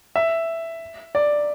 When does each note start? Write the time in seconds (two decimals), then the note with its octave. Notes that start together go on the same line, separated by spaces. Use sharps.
0.15 E5
1.15 D5